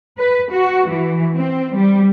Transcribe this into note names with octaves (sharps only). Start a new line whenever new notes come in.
B4
F#4
E3
C4
G3